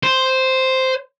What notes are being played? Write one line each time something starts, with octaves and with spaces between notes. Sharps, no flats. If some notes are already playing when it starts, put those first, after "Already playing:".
C5